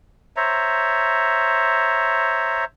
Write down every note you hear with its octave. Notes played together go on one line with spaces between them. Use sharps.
C5 C#5 E5 A#5